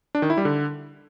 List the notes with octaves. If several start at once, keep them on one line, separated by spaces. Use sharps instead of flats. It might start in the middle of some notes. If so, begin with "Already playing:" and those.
D4
D#3
E4
G3
D3